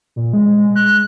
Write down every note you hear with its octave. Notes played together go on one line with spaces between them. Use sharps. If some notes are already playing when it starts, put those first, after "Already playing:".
A#2
G#3
F#6